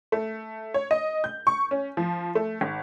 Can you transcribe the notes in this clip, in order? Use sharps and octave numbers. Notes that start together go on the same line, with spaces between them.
A3
C#5
D#5
G6
C#6
C#4
F3
A3
G#1